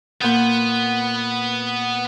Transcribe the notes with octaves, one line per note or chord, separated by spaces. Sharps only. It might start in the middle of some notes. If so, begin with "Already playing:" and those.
A#2 B3 F#5 G6